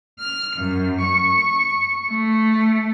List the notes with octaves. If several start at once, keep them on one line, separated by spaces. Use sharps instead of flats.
F6
F#2
C#6
A3